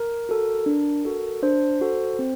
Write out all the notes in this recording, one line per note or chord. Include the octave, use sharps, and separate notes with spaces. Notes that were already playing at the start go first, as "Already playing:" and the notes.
Already playing: A#4
F#4 A4
D4
F#4 A4
D4 C5
F#4 A4
C4